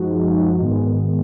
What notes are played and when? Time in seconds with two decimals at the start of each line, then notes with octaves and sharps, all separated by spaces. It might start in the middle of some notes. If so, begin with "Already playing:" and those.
Already playing: F#2 F3 G#3 D#4 F#4
0.60 G#2 D#3 G#3 B3